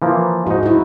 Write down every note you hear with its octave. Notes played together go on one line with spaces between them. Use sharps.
E3 F3 A#3
G#2 D#4 F#4
E4 F#4